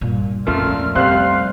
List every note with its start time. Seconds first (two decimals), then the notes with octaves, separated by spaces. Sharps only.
0.01 G2 A#2
0.47 F2 A#2 A3 C#4 F4 F6
0.95 F2 C3 G3 F5 C6 F#6